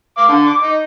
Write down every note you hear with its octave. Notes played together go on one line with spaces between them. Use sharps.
F5 D6
D3
D6
D#4